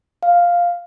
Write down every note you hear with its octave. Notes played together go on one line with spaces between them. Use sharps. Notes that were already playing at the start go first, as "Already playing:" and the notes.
F5